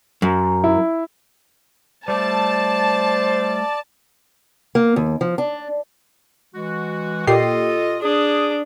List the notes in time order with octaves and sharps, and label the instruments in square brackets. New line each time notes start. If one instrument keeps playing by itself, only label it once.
[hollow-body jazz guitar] F#2
[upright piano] E4
[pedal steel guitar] G3 A3 [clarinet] C5 [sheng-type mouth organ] D5 [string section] A5
[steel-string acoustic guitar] A#3
D#2
F3
D4
[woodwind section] E3 G#3 F#4
[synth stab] A#2 G4 C7 [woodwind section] F4 A4 D#5
[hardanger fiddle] D4 [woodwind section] G#4 D#6